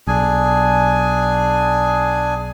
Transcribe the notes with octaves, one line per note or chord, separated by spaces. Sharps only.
B1 D4 G#4 G#5